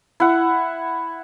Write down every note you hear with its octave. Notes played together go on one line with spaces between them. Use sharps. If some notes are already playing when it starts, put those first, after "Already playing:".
E4 F#5